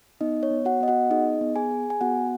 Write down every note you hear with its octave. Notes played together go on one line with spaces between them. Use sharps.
B3 D#4 D#5
C#5
B3
F#4 F#5
B3 D#5
F#4 F#5
D#4 G#4 D#5
B3
G#4 G#5
G#4
G#5
B3 F#4 F#5